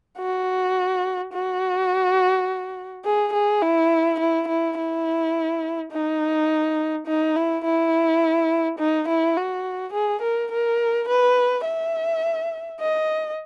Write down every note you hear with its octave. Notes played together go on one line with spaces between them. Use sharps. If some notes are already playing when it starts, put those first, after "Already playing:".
F#4
F#4
G#4
G#4
E4
E4
E4
E4
D#4
D#4
E4
E4
D#4
E4
F#4
G#4
A#4
A#4
B4
E5
D#5